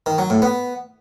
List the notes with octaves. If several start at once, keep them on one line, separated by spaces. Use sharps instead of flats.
D#3
F#3
A2
B3